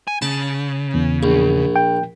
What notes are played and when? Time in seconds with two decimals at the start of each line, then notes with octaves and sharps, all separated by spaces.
0.07 G#5
0.22 C#3 A5
0.94 E2
1.23 A#1
1.76 G5